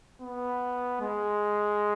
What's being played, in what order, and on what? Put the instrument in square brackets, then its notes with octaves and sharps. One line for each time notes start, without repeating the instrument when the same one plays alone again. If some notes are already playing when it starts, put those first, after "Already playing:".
[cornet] B3
G#3